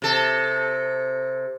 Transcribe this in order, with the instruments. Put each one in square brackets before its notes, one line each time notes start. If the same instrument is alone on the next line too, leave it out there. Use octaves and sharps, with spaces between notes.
[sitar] C3 A4